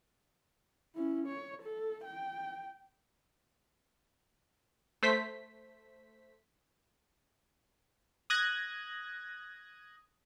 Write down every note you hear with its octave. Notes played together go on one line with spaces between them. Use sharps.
C#4 E4
C#5
A4
G5
A3 C5 B6
D#6 F#6 G#6 A#6